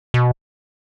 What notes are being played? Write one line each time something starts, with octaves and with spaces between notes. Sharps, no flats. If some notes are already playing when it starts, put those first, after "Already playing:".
B2